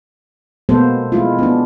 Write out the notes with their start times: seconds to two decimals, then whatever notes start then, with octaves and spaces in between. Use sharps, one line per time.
0.69 B2 G#3 A#3 B3 A4 C5
1.12 G#3 E4 F4
1.39 B3 D4